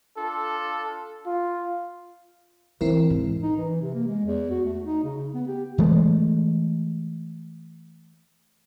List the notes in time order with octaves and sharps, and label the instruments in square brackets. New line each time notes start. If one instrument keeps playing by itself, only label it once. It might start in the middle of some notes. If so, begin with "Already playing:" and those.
[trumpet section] D4 F4 A4
[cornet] F4
[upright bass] E3 [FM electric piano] C4 E4 A#4
[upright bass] G#2
[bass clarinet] D#4
E3
C3
A#3
G#3
E2
F#4
A3
D#4
C#3
B3
G4
[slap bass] E3 F3 G#3 A3